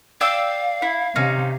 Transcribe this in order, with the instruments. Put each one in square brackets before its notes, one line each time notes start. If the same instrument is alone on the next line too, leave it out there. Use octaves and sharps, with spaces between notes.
[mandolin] D5 G5 E6 [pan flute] F5
[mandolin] E4
[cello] C3 [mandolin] C#4 D#4